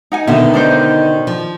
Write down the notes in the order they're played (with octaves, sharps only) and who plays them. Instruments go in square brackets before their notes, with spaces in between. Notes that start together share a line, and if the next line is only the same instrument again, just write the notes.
[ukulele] D#4 F#5 G#5
[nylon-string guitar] B2 D3 [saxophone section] D#3 [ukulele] E5
[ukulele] D4 D#4 C5
[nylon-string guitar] F3